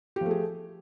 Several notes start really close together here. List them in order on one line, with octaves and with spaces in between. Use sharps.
G4 F3 A3 G#4